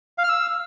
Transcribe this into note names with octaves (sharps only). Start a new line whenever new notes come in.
F5
F6
E6